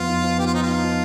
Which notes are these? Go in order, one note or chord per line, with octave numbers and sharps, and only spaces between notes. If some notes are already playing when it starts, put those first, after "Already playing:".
Already playing: F2 F3 B3 F4
D#4
F3
B3 G4
F4
F3 D#4
F4
D#4
F3